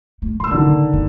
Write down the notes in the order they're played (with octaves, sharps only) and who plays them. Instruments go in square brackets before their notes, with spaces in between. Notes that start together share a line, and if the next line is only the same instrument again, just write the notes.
[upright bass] A3
[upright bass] E3 [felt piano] C6 E6
[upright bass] A#1 [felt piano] D3 D#3
[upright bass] C#3
F#1 E2